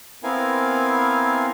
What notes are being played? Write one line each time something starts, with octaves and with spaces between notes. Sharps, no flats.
B3 C4 E4 A#4 F5 G#5